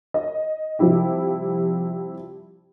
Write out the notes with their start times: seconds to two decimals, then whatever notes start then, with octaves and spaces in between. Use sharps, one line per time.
0.14 D#5
0.79 C3 F3 G3 E4 G4